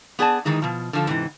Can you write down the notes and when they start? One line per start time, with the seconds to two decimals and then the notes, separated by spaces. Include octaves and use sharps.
0.19 B3 G#4 D5 A5
0.45 D#3 E3 G#3 D#4
0.62 B2 F3
0.93 D3 F3 A4
1.07 G#2 C3 E3